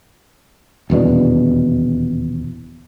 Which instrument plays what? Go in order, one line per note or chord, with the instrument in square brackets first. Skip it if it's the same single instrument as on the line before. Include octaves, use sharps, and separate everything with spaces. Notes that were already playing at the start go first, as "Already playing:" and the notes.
[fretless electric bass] D#1 E2 B2 D4